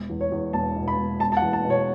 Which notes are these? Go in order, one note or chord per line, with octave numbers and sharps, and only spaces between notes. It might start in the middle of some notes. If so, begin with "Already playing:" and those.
Already playing: E1
E2
C#5
E2
E1 A5
B2
B5
E1
E1 A5
A5
F#5
E2
A5
B2
C#5